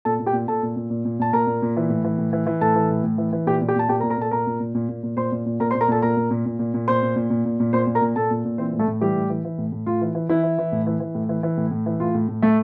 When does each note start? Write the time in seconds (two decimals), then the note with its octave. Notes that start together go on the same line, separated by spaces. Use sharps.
0.05 A#2 A4 A5
0.20 A#2
0.26 G4 G5
0.33 A#2
0.47 A#2 A4 A5
0.63 A#2
0.76 A#2
0.90 A#2
1.05 A#2
1.19 A#2 A5
1.33 A#2 A#4 A#5
1.47 A#2
1.62 A#2
1.77 E3
1.90 A2
2.04 E3
2.18 A2
2.33 E3
2.47 E3
2.61 A2 A4 A5
2.76 E3
2.90 A2
3.03 A2
3.18 E3
3.33 E3
3.46 A#2 G4 G5
3.61 A#2
3.68 G4 G5
3.76 A#2 A5
3.89 A#2 G4 G5
4.00 A#2 A#4 A#5
4.10 A#4 A#5
4.18 A#2 A4 A5
4.31 A#2 A#4 A#5
4.47 A#2
4.60 A#2
4.75 A#2
4.89 A#2
5.03 A#2
5.17 A#2 C5 C6
5.32 A#2
5.46 A#2
5.60 A#2 A#4 A#5
5.71 C5 C6
5.75 A#2
5.81 A#4 A#5
5.88 A#2 A4 A5
6.02 A#2 A#4 A#5
6.17 A#2
6.31 A#2
6.46 A#2
6.59 A#2
6.74 A#2
6.88 A#2 C5 C6
7.02 A#2
7.16 A#2
7.30 A#2
7.45 A#2
7.60 A#2
7.73 A#2 C5 C6
7.87 A#2
7.95 A#4 A#5
8.01 A#2
8.16 A#2 A4 A5
8.31 A#2
8.45 A#2
8.58 E3 C4 C5
8.73 A2
8.79 A3 A4
8.88 A2
9.01 E3 G3 G4
9.16 A2
9.30 E3
9.45 E3
9.58 A2
9.72 A2
9.86 A2 F4
10.01 E3
10.15 E3
10.29 E3 E4
10.43 E3
10.58 E3
10.72 A2
10.87 E3
11.00 E3
11.15 A2
11.29 E3
11.43 E3
11.57 A2
11.71 A2
11.86 E3
12.00 A2 F4
12.15 A2
12.28 A2
12.42 A2 A3 A4